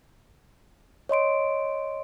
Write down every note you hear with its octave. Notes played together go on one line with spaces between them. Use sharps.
C#5 D#5 C6 D7